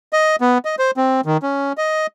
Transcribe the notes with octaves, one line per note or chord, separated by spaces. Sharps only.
D#5
B3
D#5
C5
C4
D#3
C#4
D#5